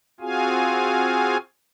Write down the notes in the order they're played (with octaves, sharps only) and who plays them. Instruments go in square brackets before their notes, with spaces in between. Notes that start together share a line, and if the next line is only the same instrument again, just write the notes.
[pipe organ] C4 F4 F#4 G#4 F5 G#5